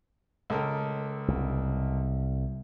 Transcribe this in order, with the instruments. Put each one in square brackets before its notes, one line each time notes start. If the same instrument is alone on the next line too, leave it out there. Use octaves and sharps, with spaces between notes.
[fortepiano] C#2 A4 A#4
[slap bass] C2